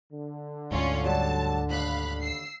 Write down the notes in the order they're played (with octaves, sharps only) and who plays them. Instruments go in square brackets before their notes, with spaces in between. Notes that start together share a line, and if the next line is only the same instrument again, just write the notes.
[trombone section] D3
[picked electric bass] D2 G#2 [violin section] C#4 F4 C#5
[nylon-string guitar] F#3 G3 [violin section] A5
[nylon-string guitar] D#2 [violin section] F5 B5 F#6
[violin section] E6 C7